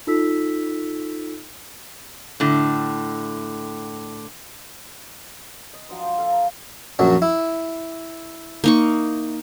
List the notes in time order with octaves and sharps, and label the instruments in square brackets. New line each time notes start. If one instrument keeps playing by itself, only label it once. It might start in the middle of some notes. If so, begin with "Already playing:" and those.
[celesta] D#4 F4 A4 E6 B6
[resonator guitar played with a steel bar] A2 D3
[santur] D#5
F3 F#3 D4 C5
G5
A4 F5
A#5
[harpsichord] A#1 F#2 F#3
E4
[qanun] A#3 D#4 C#6